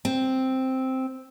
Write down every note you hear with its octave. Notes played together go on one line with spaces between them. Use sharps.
C4